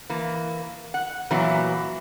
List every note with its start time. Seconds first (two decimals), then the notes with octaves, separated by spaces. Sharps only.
0.10 E3 A#3
0.94 F#5
1.31 A#2 E3 F#3 B3 E4